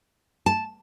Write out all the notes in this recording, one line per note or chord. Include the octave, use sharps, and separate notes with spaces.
A5